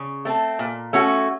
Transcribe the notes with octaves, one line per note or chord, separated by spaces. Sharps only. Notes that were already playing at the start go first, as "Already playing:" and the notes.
Already playing: C#3
A3 C4
A#2
A3 C#4 F#4